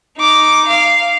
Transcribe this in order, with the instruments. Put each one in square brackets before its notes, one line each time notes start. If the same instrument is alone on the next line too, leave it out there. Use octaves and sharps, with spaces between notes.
[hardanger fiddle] D#4 D6
F5